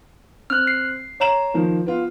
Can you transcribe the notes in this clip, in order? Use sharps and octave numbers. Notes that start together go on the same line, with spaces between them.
C4 F6 F#6
C7
C#5 A#5 E7
D#3 F3 A#3
B3 F4